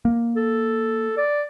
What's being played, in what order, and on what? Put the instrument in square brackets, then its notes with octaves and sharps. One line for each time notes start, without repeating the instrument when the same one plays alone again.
[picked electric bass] A#3
[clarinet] A4
D5